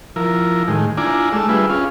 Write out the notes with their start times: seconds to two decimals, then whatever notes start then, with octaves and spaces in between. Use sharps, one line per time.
0.16 F3 E4 A#4
0.68 A2 D#3 G#3
0.97 D4 E4 F4 D5 G#5 A#5
1.32 G#3 A3 D6 E6
1.49 G3 D4 F4 G#4 B4 E5
1.70 C#4 F4 G#4 F5